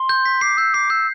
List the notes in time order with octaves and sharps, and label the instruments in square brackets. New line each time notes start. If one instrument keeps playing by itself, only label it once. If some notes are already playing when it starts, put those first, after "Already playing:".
Already playing: [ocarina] C6
[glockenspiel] G6
B6
[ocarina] D6 [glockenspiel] C7
[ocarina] E6 [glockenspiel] G6
[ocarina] D6 [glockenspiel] C7
[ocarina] E6 [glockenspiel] G6